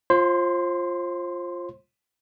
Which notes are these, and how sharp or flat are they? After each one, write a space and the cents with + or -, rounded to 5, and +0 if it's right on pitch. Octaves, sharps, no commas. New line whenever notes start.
F4 +0 C5 +30 C6 -10